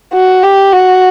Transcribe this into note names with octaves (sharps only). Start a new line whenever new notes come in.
F#4
G4
F#4